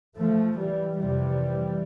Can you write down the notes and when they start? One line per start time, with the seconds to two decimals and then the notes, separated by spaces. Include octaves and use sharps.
0.18 F3 A3
0.58 E3 G3
0.98 F2 C3 E3 G3